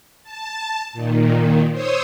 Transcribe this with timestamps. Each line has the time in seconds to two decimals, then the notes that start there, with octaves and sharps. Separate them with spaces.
0.23 A5
0.93 A#2 D#3
1.72 C5 C#5 D#6 E6